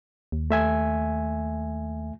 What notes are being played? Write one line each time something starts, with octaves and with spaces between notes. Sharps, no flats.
D#2
A3 E5 G#5